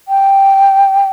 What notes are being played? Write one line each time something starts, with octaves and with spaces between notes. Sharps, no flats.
G5